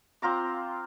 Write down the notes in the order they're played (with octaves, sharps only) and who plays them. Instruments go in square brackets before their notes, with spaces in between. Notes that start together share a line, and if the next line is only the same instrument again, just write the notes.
[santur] C4 F4 A#5 D6